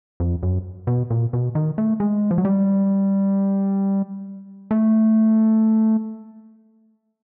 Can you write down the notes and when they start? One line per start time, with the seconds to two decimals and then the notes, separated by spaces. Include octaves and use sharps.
0.20 F2
0.43 F#2
0.87 B2
1.10 A#2
1.33 B2
1.55 D#3
1.78 A3
2.00 G#3
2.31 F3
2.38 F#3
2.45 G3
4.71 A3